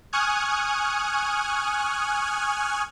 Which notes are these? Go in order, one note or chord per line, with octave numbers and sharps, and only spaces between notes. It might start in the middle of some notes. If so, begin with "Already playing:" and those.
G#5 C#6 D#6 F6 F#6 G#6